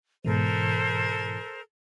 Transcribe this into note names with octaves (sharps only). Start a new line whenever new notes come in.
G#2 B2 E3 A4 A#4 C5